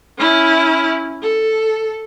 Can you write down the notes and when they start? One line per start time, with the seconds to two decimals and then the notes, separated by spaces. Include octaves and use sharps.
0.18 C#4 E4
1.22 A4